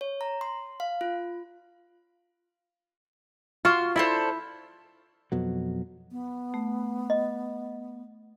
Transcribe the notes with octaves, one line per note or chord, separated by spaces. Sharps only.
C#5
A#5
C6
F5
F4
F4 F#4 C6 F6
D4 E4 A4 C5
F2 B2 F#3
B3
A3
D#5